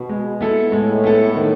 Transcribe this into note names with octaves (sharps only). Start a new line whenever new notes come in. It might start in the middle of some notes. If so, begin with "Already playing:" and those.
Already playing: B2
G#3
B3 E4 A4
A2 G#3
B3 E4 A4
D#3